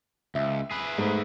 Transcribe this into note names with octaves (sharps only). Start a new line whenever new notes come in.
C#2 E5
G#4 B4
G#2 A3